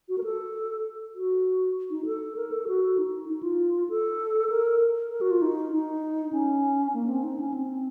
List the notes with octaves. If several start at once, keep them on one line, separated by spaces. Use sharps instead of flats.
F#4
A#4
A4
F#4
D#4
A4
A#4
A4
F#4
D#4
D#4
F4
A4
A#4
A#4
F#4
F4
D#4
D#4
C#4
A#3
C4
D#4
C#4
C4